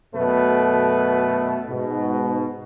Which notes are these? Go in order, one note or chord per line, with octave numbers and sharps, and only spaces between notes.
F#2 B2 A3 A4 B4
G#2 B2